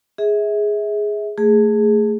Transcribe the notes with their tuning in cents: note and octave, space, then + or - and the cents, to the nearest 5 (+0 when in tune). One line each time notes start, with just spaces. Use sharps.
G#4 +0 E5 -30
A3 +20 G#4 +0